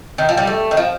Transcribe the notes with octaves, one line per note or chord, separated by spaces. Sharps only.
D#3
F3
G3
A3
D#3
F3